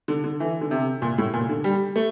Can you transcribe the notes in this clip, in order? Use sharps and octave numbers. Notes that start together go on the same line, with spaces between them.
D3
D3
E3
D3
C3
A#2
A2
A#2
D3
G3
A3